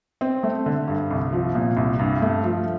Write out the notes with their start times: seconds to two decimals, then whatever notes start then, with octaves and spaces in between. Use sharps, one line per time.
0.21 C4
0.43 A3
0.66 D3
0.88 G2
1.11 C2
1.33 F3
1.55 A#2
1.77 C2
1.99 G2
2.22 A3
2.44 F3